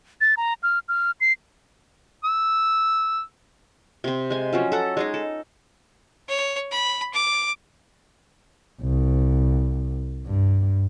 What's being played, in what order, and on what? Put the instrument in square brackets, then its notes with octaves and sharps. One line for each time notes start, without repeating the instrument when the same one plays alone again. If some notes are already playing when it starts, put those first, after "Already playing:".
[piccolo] A6
A#5
F6
F6
C7
[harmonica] E6
[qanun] C3 C4
G#3 G#5
F3 F#3 C#4
A4 F#5 A#5
G#3 D#4 G#4
A4
[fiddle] C#5
B5
D6
[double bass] C2
G2